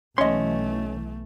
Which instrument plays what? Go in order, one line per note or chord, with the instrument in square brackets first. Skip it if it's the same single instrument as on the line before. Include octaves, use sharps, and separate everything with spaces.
[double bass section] B1 E3 [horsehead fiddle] A3 [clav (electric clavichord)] C#4 [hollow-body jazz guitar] D#5 C6